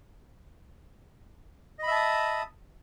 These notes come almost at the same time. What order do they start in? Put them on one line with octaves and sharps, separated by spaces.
D#5 B5 E5 A5 D#6